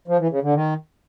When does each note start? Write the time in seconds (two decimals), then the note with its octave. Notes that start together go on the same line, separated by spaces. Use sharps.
0.08 F3
0.19 E3
0.31 C#3
0.43 D3
0.54 D#3